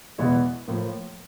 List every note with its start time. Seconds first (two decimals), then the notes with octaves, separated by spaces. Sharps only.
0.18 E2 B2 G#3 B3 E4
0.68 A2 F3 A#3